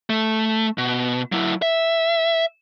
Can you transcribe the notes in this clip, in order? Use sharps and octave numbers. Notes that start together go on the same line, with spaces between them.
A3
B2
F#3 E4
E5